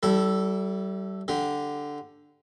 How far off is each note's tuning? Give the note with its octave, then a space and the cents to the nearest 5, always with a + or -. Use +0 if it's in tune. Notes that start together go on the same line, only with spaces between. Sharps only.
G3 -35 E4 +0 A4 +0
D3 +0 G4 +0